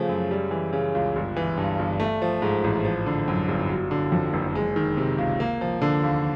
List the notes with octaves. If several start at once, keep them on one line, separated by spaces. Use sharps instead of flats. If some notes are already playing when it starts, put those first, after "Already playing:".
Already playing: C#3 F3 A3
F#2
G3
E3
C#3
C#2
G1
E3
G2
G1
A3
F3
G#2
A1
F3
D3
F#2
G1
F#3
D3
F2
F#1
G#3
D#3
C3
C#2
A#3
F3
D3
D#2